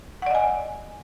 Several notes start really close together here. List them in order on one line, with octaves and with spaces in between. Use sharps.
F#5 D5 D#5 G#5